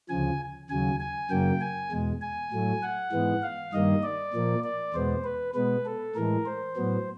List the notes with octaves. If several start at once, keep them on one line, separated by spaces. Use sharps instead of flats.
D2 C#3 F3 G#5
D#2 C#3 F#3 G#5
G#5
F#2 C#3 F#3 A#3 G5
G#5
E2 B2 G#3
G#5
A2 F#3 A3
F#5
G#2 E3 G#3 B3
F5
G2 D#3 G3 A#3 D#5
D5
A#2 F3 A#3
D5
E2 B2 G#3 B3 C5
B4
B2 G#3 B3 B4
A4
A2 E3 G#3 A#4
C5
A2 F#3 B3